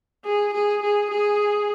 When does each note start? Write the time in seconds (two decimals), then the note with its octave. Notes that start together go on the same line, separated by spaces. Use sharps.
0.25 G#4
0.53 G#4
0.82 G#4
1.10 G#4